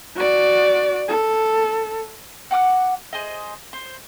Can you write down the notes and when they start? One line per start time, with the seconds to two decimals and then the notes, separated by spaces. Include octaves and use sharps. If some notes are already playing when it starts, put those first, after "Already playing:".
0.16 F#4 D5
1.08 A4
2.51 F#4 F#5 D6 F6
3.13 G#4 C5 D#5
3.73 C5